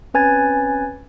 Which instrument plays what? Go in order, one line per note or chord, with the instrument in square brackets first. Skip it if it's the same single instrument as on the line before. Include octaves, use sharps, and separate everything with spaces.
[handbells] C4 C#4 B4 G#5 G#6 A6